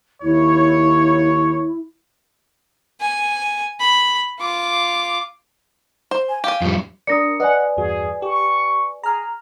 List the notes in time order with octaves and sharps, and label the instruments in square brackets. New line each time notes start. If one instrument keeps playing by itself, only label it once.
[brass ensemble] D#2 C#5 [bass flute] E4
[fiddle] G#5
B5
F4 D6
[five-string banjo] C5
[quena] G#5
[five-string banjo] G4 G#5 [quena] F5
[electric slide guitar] F2 G3
[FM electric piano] D4 A#4 D5 [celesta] D#6 A#6 C#7
[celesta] B4 D5 G#5 [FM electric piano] D#5 [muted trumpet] F#5
[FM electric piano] E2 G2 F#4 [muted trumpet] G#4
[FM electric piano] G4 [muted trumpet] C#6
[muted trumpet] G#4 [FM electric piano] A#5 F6